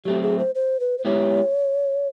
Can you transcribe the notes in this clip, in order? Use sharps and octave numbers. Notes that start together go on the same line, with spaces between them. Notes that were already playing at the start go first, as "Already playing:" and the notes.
F#3 A3 C4 G4
G#4
C5
C5
B4
C5
G#3 B3 E4 G4 C#5